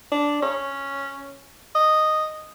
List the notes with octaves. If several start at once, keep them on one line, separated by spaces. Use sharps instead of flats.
D4
C#4
D#5